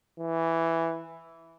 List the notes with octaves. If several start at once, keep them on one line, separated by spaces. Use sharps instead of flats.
E3